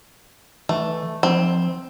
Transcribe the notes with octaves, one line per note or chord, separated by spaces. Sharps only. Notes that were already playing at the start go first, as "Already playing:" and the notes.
E3 A3
F3 C4